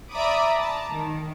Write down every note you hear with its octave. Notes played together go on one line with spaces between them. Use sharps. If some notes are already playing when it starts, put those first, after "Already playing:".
D5 E5 A#5 B5 D6 D#6
A5 A#5
D#3